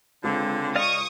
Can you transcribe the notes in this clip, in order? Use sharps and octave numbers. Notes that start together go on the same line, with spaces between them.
C#2 D3 C4
D5 D#5 F5 C#6 D#6